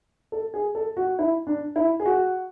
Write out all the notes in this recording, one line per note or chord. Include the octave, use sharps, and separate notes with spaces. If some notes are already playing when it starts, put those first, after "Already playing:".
A4
G#4
A4
F#4
E4
D4
E4
G#4
F#4